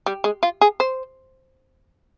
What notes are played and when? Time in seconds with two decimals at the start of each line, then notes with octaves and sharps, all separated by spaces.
0.06 G3
0.24 G#3
0.43 F4
0.61 G#4
0.80 C5